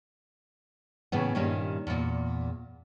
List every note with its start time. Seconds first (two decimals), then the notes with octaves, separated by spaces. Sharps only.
1.12 A2 C#3 E3 B3
1.35 G2 A#2 D#3 G3 A#3 C#4
1.87 E2 A#2